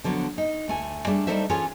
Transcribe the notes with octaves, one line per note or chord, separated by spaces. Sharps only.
D3 F3 F#3 B3
D#4
D2 A3 G#5
G3 A3 D4 G#4
G3 A3 D#4 A4 C5 E5
E3 C#4 F4 G#4 A4 C#5